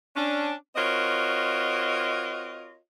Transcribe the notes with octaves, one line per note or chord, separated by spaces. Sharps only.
C#4 D4
C4 F4 F#4 A#4 C#5 D#5